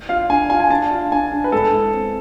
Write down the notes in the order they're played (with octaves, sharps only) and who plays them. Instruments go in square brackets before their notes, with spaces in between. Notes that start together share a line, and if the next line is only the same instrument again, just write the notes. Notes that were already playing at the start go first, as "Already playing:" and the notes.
[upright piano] F4 [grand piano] F5
[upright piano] D4 [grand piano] G#5
[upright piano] F4 [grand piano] G#5
[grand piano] G#5
[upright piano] D4 [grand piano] A5
[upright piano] F4
[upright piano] D4 [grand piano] G#5
[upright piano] D4
[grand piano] B4
[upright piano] G#2 [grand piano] A4
[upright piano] E4
C4